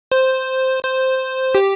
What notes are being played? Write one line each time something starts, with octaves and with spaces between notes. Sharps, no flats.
C5
C5
G4